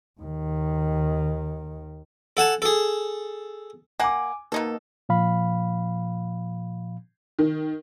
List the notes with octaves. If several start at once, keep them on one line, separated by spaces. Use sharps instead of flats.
D#2 D#3
A4 F#5 G#5 A5
G#4 A4
A#3 F#5 G#5 D6
B2 A#3 D#4 A4
A#2 F3 F5 B5
D#3